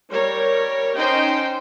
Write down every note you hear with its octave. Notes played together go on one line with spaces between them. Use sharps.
G3 A#4 C#5
C#4 D#4 C5 G5 C6